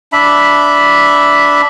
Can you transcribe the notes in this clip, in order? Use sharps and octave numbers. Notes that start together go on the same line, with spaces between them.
D4 E5 B5